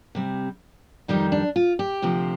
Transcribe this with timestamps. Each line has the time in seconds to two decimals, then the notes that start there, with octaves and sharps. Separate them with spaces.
0.15 C3 G3 C4
1.08 F2 D#3 G3 C4 D#4
1.32 D4
1.56 F4
1.79 G4
2.02 D2 C3 F3 C4